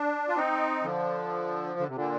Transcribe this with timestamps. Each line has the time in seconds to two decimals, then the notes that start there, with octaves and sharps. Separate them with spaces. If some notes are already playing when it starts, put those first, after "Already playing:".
Already playing: D4
0.28 F4
0.35 C4 D#4
0.83 D3 F3
1.79 D3
1.88 C3
1.95 A#2 D3